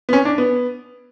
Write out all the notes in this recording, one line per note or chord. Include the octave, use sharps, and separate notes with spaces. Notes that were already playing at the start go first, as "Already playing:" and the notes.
B3
C#4
D4
B3